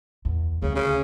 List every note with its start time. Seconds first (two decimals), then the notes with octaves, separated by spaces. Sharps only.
0.25 E2
0.62 D2 C#3
0.75 C#3